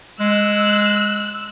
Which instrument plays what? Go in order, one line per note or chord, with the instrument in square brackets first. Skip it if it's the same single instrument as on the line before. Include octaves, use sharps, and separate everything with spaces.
[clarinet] G#3 [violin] E6 F#6